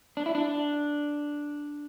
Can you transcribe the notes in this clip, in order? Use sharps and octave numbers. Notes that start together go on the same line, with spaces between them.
D4
E4
D4